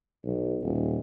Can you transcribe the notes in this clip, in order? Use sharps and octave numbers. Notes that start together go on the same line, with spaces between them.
B1
D#1